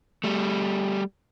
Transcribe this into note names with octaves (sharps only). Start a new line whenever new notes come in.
G3 A3